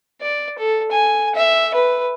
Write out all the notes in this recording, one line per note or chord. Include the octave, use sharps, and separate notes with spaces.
D5
A4
G#5
E5
B4